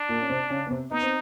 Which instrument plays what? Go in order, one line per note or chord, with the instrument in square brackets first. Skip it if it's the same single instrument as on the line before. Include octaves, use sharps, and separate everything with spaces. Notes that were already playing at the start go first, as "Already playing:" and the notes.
Already playing: [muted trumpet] D4
[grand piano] A#2 A#3
C#4
C3 C4
C#3 C#4
B3
C3 C4
[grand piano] B3 [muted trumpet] D#4
[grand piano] C4